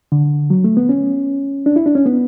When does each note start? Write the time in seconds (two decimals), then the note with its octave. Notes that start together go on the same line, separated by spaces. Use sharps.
0.12 D3
0.50 F#3
0.64 A3
0.77 B3
0.89 C#4
1.66 D4
1.76 E4
1.86 D4
1.95 C#4
2.06 B3